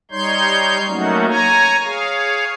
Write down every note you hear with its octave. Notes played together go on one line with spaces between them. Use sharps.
G3 D#4 C#5 C6 G6
F#3 A3 A#3 C#4 D#4 F#4
C#5 G#5 A#5
G#4 C#5 F5